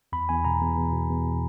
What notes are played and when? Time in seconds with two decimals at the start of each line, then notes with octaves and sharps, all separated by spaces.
0.13 E2 B5
0.29 E2 G#5
0.45 B2 A#5
0.61 E2
0.77 E2
0.93 B2
1.09 E2